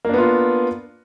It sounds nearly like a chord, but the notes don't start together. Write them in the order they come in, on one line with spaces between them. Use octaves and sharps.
A#3 D4 B3 F4